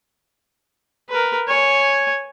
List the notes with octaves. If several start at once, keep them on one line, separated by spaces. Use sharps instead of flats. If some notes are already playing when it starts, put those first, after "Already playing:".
A#4 B4
C#5 G#5